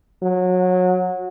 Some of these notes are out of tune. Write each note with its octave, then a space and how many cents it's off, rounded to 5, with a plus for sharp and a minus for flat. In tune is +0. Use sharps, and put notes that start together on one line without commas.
F#3 -25